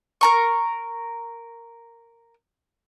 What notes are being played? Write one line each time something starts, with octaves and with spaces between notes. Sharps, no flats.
A#4 A#5 C#6